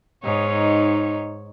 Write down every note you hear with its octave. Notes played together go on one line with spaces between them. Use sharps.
G#2 D#4 C#5